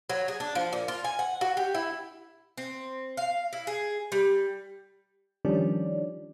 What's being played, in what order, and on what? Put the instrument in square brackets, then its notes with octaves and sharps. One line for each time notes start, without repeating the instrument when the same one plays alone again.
[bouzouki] F#3
G#4
D4
F3
A#2
F4
G#5
F#5
F#4
G4
E4
C4
F5
E4
G#4
G3
[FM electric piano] D#3 F3 G3 C#4 D4 D5